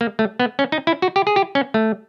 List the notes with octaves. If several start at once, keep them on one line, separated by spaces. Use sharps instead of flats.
A#3
A3
B3
C#4
D#4
E4
F#4
G4
G#4
G4
C#4
A3